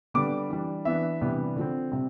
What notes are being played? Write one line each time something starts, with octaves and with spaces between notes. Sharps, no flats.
D3 G3 B3 D4 D6
E3 G3 D4
E3 B3 D4 E5
C3 E3 G3 B3 D4
D3 F3 C4
C3 G3 C4